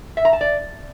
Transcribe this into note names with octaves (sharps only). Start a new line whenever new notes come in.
E5
A#5
A5
D5